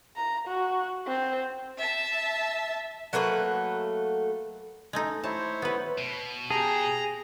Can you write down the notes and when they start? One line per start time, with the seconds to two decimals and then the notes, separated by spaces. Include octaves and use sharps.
0.16 A#5
0.48 F#4
1.07 C4
1.78 E5 A5
3.13 F#3 A3 A#3 B4
4.93 G#3 A3 D#4
5.24 E4 C5 C#5 A5
5.62 B3 B4
5.98 B2
6.50 G4 G#4 G5 A5 A#5